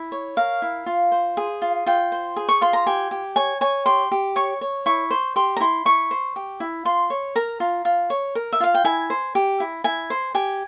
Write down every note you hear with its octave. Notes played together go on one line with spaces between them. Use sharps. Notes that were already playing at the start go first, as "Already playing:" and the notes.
Already playing: E4
C#5
A#4 F5
E4
F4
C5
G#4
F4
F4 G5
C5
G#4
C#6
F4 C6
A#5
G4 G#5
G4
C#5 G#5
C#5 G#5
G4 C6
G4
C#5 C#6
C#5
E4 C#6
C5
G4 C6
A#5
E4 C6
E4 C#6
C5
G4
E4
F4 C6
C#5
A#4 A#5
F4
F4
C#5
A#4
E5
F4 F5
G5
E4 G#5
C5
G4
E4
E4 G#5
C5
G4 G#5